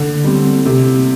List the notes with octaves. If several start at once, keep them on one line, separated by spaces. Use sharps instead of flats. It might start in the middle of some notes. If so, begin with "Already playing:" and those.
Already playing: D3
G3 C4
C3